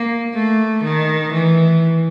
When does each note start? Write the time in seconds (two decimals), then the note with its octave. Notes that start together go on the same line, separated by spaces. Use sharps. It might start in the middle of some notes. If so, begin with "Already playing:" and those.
Already playing: A#3
0.34 A3
0.84 D#3
1.33 E3